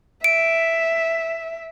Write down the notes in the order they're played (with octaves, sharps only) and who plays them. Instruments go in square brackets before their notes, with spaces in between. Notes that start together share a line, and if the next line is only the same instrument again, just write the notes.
[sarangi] E5 [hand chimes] D7